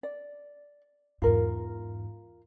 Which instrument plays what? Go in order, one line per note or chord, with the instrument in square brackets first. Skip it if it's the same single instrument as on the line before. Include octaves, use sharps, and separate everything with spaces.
[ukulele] D5
[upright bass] E2 G#2 [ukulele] F4 A#4